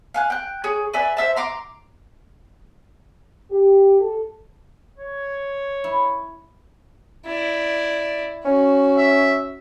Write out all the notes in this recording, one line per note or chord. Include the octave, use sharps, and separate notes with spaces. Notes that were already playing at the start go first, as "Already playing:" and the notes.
F5 G#5 F#6
G5 F#6
G#4 C#5
B4 D5 E5 G#5
C5 E5 A5
A#5 C6 D6
G4
A4
C#5
E4
E4 D5
C#4 F#4
E5